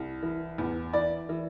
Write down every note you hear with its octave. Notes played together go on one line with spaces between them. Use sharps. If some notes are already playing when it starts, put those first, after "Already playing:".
Already playing: C2
E3
E2
E3 D5
E3